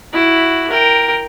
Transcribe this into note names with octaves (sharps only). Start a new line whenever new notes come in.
E4 F#4
A#4 G5